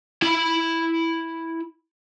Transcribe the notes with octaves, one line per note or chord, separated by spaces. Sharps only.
E4 B5